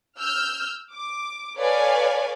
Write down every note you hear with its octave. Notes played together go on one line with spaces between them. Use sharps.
E6 F6 G6
D6
A4 B4 C#5 D5 F5 G#5